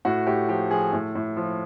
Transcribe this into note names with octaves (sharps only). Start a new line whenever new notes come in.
A2 F#4
A2 G4
F3 G4
F3 G#4
A2
A2
F3